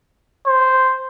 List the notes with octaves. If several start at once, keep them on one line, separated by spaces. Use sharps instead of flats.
C5